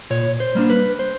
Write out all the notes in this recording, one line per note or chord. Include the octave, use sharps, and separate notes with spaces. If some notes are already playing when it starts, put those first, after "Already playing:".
A#2 C#5
C5
G3 A#3 D4
B4
C5